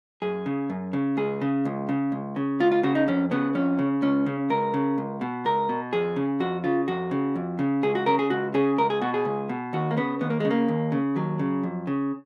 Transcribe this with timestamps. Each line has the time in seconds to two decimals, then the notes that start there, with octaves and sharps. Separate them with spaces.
0.22 F#2 G#4
0.46 C#3
0.70 F#2
0.93 C#3
1.17 C#2 G#4
1.41 C#3
1.65 C#2
1.89 C#3
2.12 C#2
2.36 C#3
2.60 C#2 F4
2.72 F4
2.83 C#3 F#4
2.95 D#4
3.08 F2 C#4
3.31 C#3 B3
3.55 F2 C#4
3.79 C#3
4.02 C#2 C#4
4.26 C#3
4.50 C#2 A#4
4.74 C#3
4.98 C#2
5.21 B2
5.45 C#2 A#4
5.69 B2
5.93 F2 G#4
6.16 C#3
6.40 F2 F#4
6.64 C#3 F4
6.88 F2 F#4
7.11 C#3
7.36 F2
7.59 C#3
7.83 C#2 G#4
7.95 F#4
8.06 C#3 A#4
8.19 G#4
8.30 C#2 F#4
8.54 C#3 G#4
8.78 C#2 A#4
8.90 G#4
9.02 B2 F#4
9.14 G#4
9.25 C#2
9.49 B2
9.73 D#2 F#4
9.91 A#3
9.97 C#3 B3
10.21 D#2 B3
10.30 A#3
10.40 C#3 G#3
10.51 A#3
10.68 D#2
10.92 C#3
11.16 D#2 F#3
11.39 C#3
11.63 F2
11.87 C#3